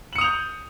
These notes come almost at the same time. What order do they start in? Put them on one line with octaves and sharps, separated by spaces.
F#7 C#7 D#6 F7 G6